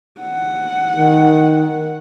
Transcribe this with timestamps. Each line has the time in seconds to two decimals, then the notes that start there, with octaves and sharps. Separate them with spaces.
0.21 F#5
0.96 D#3